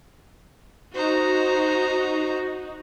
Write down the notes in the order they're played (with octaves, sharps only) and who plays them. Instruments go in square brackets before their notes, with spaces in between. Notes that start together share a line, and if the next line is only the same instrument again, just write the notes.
[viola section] D#4 F#4 [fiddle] C5 A#5